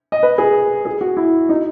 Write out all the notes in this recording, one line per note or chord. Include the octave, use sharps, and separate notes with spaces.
D#5
B4
G#4
G#4
F#4
E4
D#4